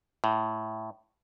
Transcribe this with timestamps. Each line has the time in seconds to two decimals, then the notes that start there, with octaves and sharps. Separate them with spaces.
0.24 A2